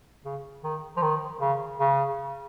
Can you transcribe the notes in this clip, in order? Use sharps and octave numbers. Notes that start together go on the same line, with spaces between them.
C#3
D#3
F3
D#3
C#3
C#3